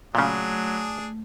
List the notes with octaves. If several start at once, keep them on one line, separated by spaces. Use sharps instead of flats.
A#2 C#3 F#3 A3 D4 G#4